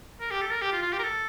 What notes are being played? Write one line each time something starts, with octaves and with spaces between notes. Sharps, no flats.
A#4
G4
A4
A#4
G4
F4
F4
G4
A#4
A4